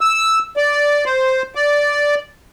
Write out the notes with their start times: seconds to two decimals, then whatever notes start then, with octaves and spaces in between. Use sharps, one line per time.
0.01 E6
0.57 D5
1.05 C5
1.55 D5